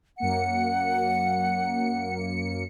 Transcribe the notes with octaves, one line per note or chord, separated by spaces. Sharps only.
F#2 A#3 F#5 C#7